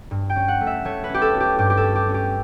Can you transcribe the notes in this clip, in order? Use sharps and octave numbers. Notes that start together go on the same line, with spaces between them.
G2
G5
C#4
F#5
A3
E5
A3 C#5
B4
C#4
G4
A4
C#4
G4
G2 G4
G4
A4
C#4
G4
C#4
G4